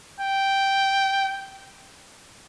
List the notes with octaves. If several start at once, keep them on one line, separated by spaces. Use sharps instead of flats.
G5